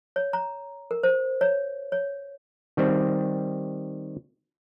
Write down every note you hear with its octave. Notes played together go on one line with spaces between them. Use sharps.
C#5
A#5
A#4
C5
C#5
C#5
D#3 G3 C4